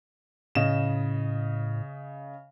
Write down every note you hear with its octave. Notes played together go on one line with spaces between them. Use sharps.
A2 C#3 D#5 E7